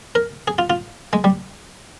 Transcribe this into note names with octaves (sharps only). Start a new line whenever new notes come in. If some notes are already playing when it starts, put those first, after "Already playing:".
A#4
G#4
F4
F4
G#3
G3